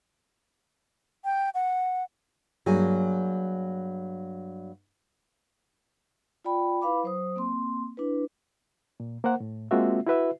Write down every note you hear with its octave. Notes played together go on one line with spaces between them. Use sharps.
G5
F#5
G2 F#3 A#3 G#4 G#5
F4 D5 G5 B5
E4 B4 F5 B5 D6
F#3 C5 D#6
A#3 C4 C6
D4 E4 B4
A#2
A#3 A#4 C5 F#5
A2
G#3 A#3 C4 F4 F#4 E5
E4 F#4 B4 E5